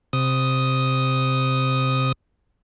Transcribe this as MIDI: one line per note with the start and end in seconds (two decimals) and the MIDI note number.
0.13 2.12 48
0.13 2.12 87